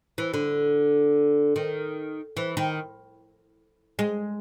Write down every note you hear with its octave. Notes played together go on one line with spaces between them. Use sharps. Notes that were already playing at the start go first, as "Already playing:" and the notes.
E3
D3
D#3
E3
D#3
G#3